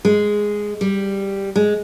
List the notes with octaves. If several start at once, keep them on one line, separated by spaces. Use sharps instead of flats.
G#3
G3
G#3